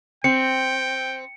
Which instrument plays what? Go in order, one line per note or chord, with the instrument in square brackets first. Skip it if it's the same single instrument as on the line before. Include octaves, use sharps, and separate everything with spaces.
[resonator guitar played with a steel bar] C4 [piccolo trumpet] G5 [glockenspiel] C#7